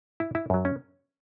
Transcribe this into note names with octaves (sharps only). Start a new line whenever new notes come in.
E4
E4
F#2 F#3
C#4